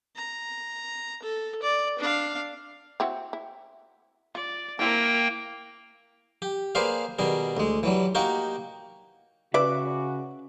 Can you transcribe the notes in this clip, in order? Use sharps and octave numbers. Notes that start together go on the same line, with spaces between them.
A#5
A4
D5
D4 F5
C4 E4 F#4
E4
F4 D5
A#3 C4 D4 E4 A#4 G5
G4
A#3 G#4 B4 C5 D5 F5
B2 D#3 G3 G#4
D2 G#3
E3 F#3 G3
A#3 D#4 F#4 G4 A#4
C#3 F#4 B4 D5 E5 D6